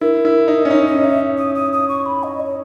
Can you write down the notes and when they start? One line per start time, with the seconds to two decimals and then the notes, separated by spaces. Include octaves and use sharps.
0.01 E4 A#4
0.25 E4
0.48 D#4
0.65 C#4
0.70 D#4 C#5
0.86 D#5
0.94 C#4
1.03 D#4 E5
1.38 D#6
1.55 D#6
1.72 D#6
1.89 C#6
2.06 B5
2.23 D#5
2.40 C#5